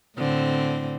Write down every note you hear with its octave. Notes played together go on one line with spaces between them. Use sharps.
A2 D3 C4